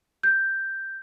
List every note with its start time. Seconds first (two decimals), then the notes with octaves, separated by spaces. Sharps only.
0.23 G6